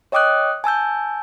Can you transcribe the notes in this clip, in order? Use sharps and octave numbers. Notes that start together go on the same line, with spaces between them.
C#5 D#5 G5 D6 D#6 F#6
G#5 A5 E6 G6